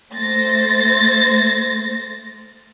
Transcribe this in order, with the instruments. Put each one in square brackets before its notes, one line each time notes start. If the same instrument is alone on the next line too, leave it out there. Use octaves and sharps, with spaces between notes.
[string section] A3 C5 A6 A#6